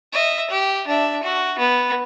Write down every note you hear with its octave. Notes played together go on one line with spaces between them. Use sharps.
D#5 E5
G4
D4 E5
F#4
B3